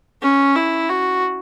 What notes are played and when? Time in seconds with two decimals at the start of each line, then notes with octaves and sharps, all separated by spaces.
0.22 C#4
0.55 E4
0.89 F#4